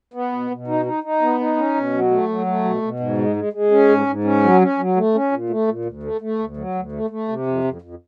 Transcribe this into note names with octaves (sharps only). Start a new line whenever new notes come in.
B3
B2
B2
D#4
D#4
D#4
B3
D#4
C#4
B2
F#3
A3
F#3
A3
B2
B2
G#2
G#3
G#3
G#3
C#4
G#2
G#2
C#4
F#3
C#4
F#3
A3
C#4
A#2
A3
A#2
D2
A3
A3
D2
F#3
D2
A3
A3
C3
F2
F2
F2